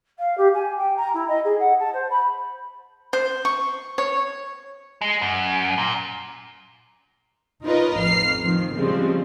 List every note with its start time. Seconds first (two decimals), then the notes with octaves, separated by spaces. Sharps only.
0.18 F5
0.37 G4
0.54 G#5
0.77 G5
0.96 A#5
1.13 E4
1.28 D#5
1.45 G#4
1.59 F#5
1.79 A5
1.93 C5
2.10 B5
3.13 C5
3.45 C#6
3.98 C#5
5.02 G#3
5.21 F#2
5.78 A#2
7.63 D#4 F4 A#4 B4 C#5 D#5
7.96 A1 F2 F6 C7
8.40 D#3 F3 C4
8.75 C#3 F3 G3 G#3 C4